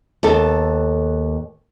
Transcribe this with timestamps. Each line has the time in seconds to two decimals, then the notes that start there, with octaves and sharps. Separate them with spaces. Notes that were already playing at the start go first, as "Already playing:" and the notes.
0.23 D#2 B3 A4